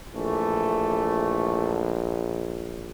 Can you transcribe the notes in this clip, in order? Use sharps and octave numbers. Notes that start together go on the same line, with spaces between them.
A#1 E3 A3